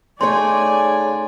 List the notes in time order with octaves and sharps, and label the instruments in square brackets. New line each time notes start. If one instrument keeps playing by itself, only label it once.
[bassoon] C#3 [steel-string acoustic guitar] A3 D#4 C#5 [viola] D5 G#5 [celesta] C6